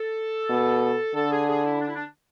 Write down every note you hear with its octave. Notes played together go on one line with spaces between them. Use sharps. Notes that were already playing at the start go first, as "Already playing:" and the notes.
Already playing: A4
B2
D3 A4
G#4
G#4
E4
D4
E4
D4